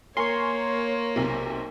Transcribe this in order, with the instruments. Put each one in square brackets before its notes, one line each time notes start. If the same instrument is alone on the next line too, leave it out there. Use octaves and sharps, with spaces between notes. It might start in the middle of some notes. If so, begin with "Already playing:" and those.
[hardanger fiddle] A#3 [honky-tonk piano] A#4 G#5 [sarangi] C#5 [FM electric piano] C6 C#6
[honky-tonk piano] B1 C3